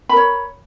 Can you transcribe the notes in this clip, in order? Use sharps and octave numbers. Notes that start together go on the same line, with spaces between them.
A#4 C#5 B5